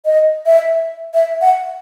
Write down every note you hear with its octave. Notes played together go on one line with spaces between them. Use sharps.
D#5
E5
E5
F#5